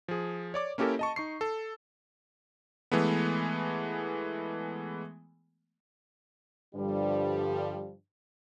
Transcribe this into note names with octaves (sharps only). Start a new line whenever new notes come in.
F3 G#4
C#5 D5 D6
A#3 C#4 E4 G4 A4 A#4
D#5 A5 C#6
D#4 C#6 C7
A4
E3 G#3 A3 B3
G2 D3 F3 G3